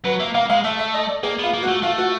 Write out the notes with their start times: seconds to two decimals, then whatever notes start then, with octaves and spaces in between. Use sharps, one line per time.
0.05 F#3 B4
0.20 A#3 E5
0.34 A#3 F5
0.50 G#3 F5
0.64 A3 E5
0.79 E5
0.94 D#5
1.09 D5
1.23 A#3 G#4
1.39 B3 F4
1.54 A#3
1.63 F#4
1.68 A3
1.83 A3 F4
1.98 F#4